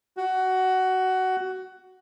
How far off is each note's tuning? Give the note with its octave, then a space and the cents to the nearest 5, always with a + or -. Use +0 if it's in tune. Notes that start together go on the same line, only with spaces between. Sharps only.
F#4 +15